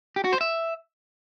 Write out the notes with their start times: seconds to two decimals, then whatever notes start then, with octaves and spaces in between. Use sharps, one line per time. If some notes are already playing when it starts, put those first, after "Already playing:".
0.16 G4
0.24 F#4
0.33 C5
0.41 E5